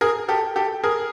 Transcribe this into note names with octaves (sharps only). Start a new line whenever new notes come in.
G#4 A#4
G4 A4
G4 A4
G#4 A#4